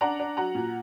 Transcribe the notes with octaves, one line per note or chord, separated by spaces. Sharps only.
D4 F#5 A#5
D4
F#3 F#5 A#5
A#2